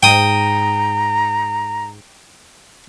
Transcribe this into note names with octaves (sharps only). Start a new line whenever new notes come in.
G#2 G5 A#5 D#6